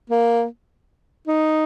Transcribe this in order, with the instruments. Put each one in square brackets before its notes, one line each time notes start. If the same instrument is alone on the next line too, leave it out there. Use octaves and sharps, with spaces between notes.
[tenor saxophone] A#3
D#4